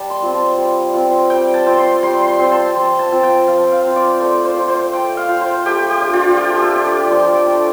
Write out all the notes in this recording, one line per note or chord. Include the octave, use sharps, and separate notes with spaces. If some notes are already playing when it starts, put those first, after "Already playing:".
Already playing: G3 A5
C6
C4 F4
A5
G3
C4 F4
G3 G5
A5
C4 F4
C6
G3 C6
C6
C4 F4
A5
F3 C6
A5
C4 F4
G5
F3 F5
F5
C4 F4
D5
A3 C5
C5
F4
C5
A3 G5
F5
F4
C5
A3 G4
G4
D4 F4
F4
A3 G4
G4
A4
D4 F4
D5
F3 C6
D6
A3 D4